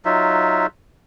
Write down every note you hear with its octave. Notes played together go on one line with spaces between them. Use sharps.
F#3 D#4 F4 E5